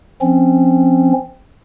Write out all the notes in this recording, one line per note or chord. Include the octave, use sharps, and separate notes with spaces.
F3 C4 C#4